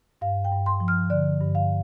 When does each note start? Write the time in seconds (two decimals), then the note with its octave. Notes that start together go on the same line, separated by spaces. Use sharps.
0.21 G2 F5
0.44 G5
0.52 G2
0.66 C6
0.80 F3
0.88 F6
1.10 D3 D5
1.41 G2
1.55 F5